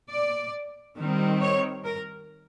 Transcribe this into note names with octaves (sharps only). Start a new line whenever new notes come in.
D5
D#3 G3 C4
C#5
A#4